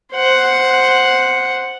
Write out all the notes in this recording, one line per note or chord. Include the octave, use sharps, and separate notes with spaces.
C5 F#5